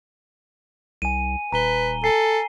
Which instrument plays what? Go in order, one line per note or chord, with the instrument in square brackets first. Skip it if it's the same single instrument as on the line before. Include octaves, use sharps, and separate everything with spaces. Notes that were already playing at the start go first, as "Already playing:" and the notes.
[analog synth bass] C2 [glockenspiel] G#5 D#7
[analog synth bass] D#1 [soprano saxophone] B4 [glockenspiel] A#5 D#7 G7
[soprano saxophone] A4 [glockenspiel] G#5 C7